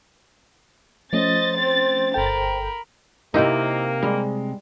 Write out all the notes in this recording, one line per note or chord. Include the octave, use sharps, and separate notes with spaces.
F3 A3 C#4 C5 D#5 A6
C4
G1 A4 A#4 G5 B5
C3 A#3 D#4 E4 G4 C5 D#5
G3 G#3